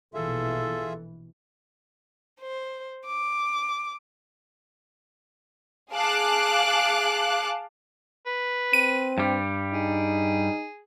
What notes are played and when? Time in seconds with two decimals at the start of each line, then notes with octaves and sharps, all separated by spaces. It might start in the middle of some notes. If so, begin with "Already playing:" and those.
0.14 A#1 B2 E3 F4 G#4 A4 E5
2.40 C5
3.06 D6
5.92 G#4 F5 A5 D6 F#6
8.26 B4
8.73 C4 D#7
9.18 G2 G3
9.73 D#4 G#4